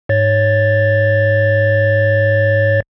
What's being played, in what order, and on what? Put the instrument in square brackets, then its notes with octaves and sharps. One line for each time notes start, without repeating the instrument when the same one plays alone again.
[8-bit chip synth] G#2 C#5 A6